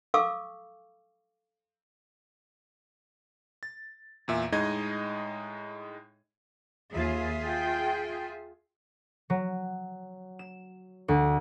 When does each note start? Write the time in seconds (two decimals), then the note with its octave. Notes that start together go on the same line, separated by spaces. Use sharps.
0.14 A4 F5 C#6 D6 E6
3.63 A6
4.28 E2 A#2 E5
4.52 A2 G#3 D#4 D#5 G#6
6.93 D#2 F4 G#4 E5
7.48 G5
9.30 F#3
10.39 E7
11.08 D2